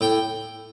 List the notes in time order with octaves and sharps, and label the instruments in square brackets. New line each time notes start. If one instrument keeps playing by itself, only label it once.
[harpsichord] A2 G5